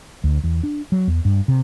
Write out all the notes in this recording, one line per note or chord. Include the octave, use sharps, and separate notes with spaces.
D2
E2
D4
F#3
E2
G2
C3